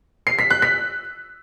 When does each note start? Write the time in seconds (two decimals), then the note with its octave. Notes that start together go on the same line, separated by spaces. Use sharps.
0.27 C7
0.39 B6
0.50 F#6
0.62 B6